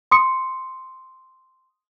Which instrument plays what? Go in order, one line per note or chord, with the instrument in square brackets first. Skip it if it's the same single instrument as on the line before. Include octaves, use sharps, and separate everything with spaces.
[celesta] C6 D#6 C#7